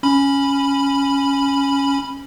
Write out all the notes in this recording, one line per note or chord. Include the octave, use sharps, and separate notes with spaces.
C#4 B5